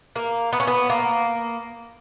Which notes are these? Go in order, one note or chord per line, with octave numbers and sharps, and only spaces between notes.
A#3
B3
C#4
B3
A#3